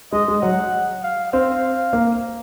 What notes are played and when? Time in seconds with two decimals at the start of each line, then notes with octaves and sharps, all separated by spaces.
0.12 G#3 D#5
0.28 G#3
0.42 F#3 F#5
1.03 F5
1.33 C4 F5
1.93 A#3